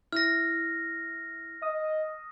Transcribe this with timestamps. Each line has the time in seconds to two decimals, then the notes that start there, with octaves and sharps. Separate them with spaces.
0.12 E4 F6 A#6
1.62 D#5 D#6